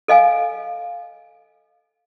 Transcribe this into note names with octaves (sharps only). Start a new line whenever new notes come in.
A4 D#5 F5 G#5